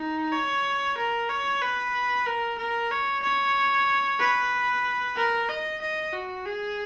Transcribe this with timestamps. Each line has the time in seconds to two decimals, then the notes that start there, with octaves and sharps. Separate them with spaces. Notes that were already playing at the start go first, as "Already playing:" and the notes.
Already playing: D#4
0.32 C#5
0.98 A#4
1.29 C#5
1.61 B4
2.26 A#4
2.58 A#4
2.91 C#5
3.23 C#5
4.19 B4
5.16 A#4
5.49 D#5
5.81 D#5
6.13 F#4
6.46 G#4